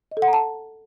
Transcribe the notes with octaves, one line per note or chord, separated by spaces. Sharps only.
D#5
A4
F#5
A#5
A5